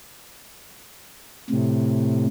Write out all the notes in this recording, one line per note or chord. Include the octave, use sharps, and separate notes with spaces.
A2 C3